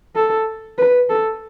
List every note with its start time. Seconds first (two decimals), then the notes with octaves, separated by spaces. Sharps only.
0.15 A4
0.78 B4
1.10 A4